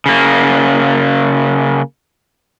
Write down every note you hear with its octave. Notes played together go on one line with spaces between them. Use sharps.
C#3 A#3